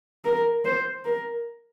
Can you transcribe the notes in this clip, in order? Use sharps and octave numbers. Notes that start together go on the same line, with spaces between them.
A#4
C5
A#4